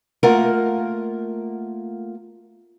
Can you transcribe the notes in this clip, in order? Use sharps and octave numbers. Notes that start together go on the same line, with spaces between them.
A3 A#3 F4 A#4 F#5